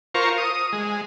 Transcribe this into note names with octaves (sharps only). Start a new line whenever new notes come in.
F4 A#4 C5 C#6
D#6
G#3